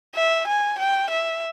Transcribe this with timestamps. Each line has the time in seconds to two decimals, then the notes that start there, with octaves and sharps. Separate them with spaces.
0.15 E5
0.47 G#5
0.78 G5
1.10 E5